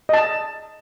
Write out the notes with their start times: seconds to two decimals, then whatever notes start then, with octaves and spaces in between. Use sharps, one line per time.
0.09 D#5 A5